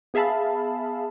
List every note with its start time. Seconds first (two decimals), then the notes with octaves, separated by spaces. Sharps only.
0.14 B3 G#4 E5 F5 A5 B5